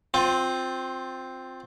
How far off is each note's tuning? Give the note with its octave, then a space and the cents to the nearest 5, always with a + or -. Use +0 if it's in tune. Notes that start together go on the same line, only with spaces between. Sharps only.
C4 +0 F4 +25